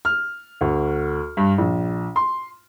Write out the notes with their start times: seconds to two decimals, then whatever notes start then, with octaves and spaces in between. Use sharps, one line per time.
0.05 F6
0.61 D2
1.37 G2
1.58 A#1
2.16 C6